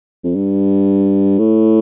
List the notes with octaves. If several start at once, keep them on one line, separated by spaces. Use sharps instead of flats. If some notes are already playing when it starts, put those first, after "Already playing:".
F2
G2
A2